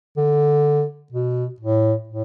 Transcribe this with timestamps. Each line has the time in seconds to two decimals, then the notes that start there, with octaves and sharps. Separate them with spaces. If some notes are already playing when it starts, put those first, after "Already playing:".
0.17 D3
1.12 B2
1.60 A2
2.08 A2